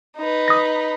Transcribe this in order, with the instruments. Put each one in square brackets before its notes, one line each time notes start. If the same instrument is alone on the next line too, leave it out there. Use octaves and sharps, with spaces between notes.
[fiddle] D#4 B4
[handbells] D#6 A#6